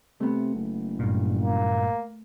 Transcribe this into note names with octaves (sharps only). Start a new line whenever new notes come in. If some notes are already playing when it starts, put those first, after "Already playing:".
C3 A3 B3
F#1
G2 A#2
A#3